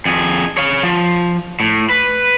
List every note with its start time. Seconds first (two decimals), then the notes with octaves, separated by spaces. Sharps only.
0.05 F2 G#4
0.57 C#5 F5
0.83 F3
1.60 A2
1.89 B4